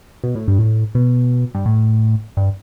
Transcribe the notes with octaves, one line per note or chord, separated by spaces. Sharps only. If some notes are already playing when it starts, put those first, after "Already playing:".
B2
A2
G2
A2
B2
G2
A2
G2